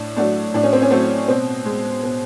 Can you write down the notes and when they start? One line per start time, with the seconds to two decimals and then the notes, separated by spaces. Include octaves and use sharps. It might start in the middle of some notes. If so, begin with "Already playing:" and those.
Already playing: A2 D4
0.16 F#3 A3 D4
0.54 A2 D4
0.63 C#4
0.73 C4
0.82 C#4
0.91 F#3 A3 C4
1.28 B2 C4
1.65 G#3
2.03 B2